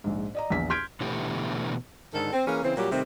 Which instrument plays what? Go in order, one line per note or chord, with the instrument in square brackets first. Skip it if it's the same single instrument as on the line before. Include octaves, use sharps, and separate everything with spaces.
[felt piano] A#1 G#2
D5 D#5 A#5
A#1 E2 B6
C6 F6 G6 G#6 B6 D7
[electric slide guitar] B2 D3 E3 A3 B3 G4
[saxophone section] G#2 D3 D#3 A4
C4
E3 A#3 C#4 G#4 A#4
C#3 E3 C4
A#2 F#3 G3 F#4 G4
C3 D#3 G3 A3 C4